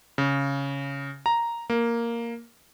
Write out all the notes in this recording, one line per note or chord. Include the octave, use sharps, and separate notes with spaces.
C#3
A#5
A#3